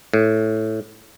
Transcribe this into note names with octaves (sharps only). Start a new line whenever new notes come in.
A2